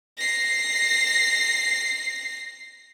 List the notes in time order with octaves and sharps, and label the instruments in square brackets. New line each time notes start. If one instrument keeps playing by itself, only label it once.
[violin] A#6 C7